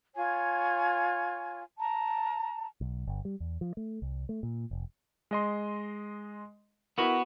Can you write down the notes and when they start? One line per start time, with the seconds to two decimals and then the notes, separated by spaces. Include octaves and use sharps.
0.15 F4 C#5 G#5
1.78 A5 A#5
2.81 B1
3.07 G1
3.25 G3
3.40 E2
3.61 F3
3.77 A3
4.02 C2
4.29 A3
4.43 A#2
4.71 F1
5.31 G#3 D#5 C6
6.98 B3 E4 F#4 A#4